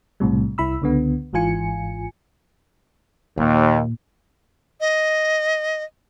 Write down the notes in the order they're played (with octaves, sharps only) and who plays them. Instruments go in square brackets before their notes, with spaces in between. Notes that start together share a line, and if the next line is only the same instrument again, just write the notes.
[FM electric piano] B1 A2 C3 G3
C2 E4 B5 E6
C#2 D3 B3
G#1 G#2 E3 F4 G#5 C#7
[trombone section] D#2 [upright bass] A#2
[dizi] D#5